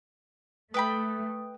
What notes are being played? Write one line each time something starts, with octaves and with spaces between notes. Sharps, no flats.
A3 B4 G5 B5 D#6